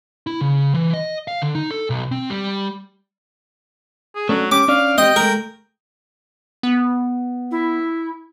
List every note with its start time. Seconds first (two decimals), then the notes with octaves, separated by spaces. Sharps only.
0.27 E4
0.41 C#3
0.74 E3
0.94 D#5
1.28 F5
1.42 D3
1.55 D#4
1.71 A4
1.90 B1
2.12 C4
2.30 G3
4.16 G#4
4.29 F#3 A3 C#4 D4
4.51 C#4 G4 D6
4.68 C#4 D4 D5 F5
4.98 C4 G4 D#5 G5
5.16 G#3 A3 A#4
6.63 B3
7.51 E4